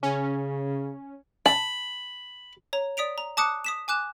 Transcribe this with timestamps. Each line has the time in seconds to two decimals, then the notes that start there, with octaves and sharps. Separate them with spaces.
0.03 C#3 C#4
1.46 A5 B5
2.73 C#5 A#5
2.97 D5 D#6 B6 D7 F7
3.18 A#5
3.37 A5 D6 D#6 F#6 C#7
3.64 D#6 B6 E7
3.88 G#5 D6 F#6 E7